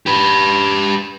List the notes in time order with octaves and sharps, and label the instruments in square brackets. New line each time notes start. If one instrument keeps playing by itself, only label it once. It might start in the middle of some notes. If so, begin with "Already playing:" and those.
[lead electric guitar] G4 B4